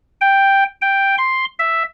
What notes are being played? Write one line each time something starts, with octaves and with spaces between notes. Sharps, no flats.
G5
G5
C6
E5